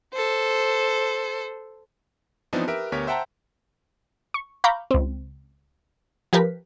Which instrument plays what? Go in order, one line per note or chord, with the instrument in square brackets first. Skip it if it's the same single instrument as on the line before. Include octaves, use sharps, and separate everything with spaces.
[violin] A4 C5
[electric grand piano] E3 F3 B3 C4 D4 D#4
G4 A#4 B4 E5 D7
D2 B3 G4 A#4 C#5 B6
C5 E5 F#5 G5 A5 A#5
[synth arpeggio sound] C#6
F5 A#5 B5 C#6 D6 G6
C#2 C4
F3 G4 A#4 B4 B6